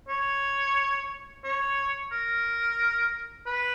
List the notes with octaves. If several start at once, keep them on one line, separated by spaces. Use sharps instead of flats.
C#5
C#5
A#4
B4